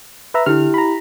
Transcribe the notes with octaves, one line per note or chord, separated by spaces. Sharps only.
B4 E5 A#5
D3 E4 G4 F6
A#5 B5